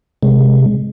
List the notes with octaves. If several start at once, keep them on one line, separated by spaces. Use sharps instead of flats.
C3 G#3